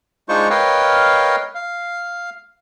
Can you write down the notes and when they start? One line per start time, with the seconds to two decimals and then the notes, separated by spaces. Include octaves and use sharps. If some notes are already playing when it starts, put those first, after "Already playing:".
0.29 G#3 D4 D#4 F4 C5 C#6
0.50 A#4 B4 C#5 D#5 F5 G5
1.55 F5